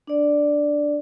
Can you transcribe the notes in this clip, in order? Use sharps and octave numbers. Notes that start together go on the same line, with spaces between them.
D4 D5